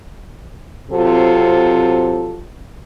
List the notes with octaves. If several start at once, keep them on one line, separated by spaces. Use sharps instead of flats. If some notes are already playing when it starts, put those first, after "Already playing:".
C3 F#3 C4 F4 A4